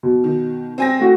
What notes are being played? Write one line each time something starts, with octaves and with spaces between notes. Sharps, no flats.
B2
D#3
C4 G#5 A#6
A3 F#4